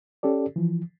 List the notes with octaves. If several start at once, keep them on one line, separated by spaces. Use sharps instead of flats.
C#4 G4 A4 D5
E3 F3